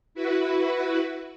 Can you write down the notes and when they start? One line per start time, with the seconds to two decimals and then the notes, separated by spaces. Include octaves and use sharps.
0.14 E4 F#4 B4